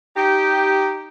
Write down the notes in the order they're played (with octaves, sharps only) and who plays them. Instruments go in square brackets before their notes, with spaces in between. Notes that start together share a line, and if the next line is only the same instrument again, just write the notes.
[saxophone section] D#4 G4